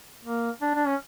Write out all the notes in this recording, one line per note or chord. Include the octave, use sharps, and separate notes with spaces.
A#3
D4
D4
C#4